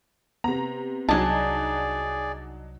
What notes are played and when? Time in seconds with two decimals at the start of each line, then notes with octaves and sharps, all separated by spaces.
0.44 C3 B3 A#5
1.09 C2 F#3 D4 D#4 G#4 D5 G#5 A5